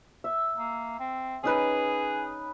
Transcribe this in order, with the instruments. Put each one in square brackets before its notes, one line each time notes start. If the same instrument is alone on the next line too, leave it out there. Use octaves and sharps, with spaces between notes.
[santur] E5
[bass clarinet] A#3
C4
[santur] C#4 D#4 B4 [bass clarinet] G#4